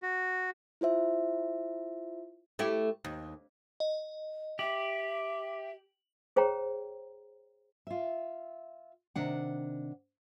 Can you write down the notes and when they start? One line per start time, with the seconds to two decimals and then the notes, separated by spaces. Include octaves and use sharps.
0.03 F#4
0.81 E4 F4 C5 E5
2.59 A3 E4 G4
3.05 D#2
3.80 D#5
4.59 G4 E5 F#7
6.36 G#4 C5 C#5 G5 A#5
7.87 F4 E5
9.15 C3 D#3 D4 F#5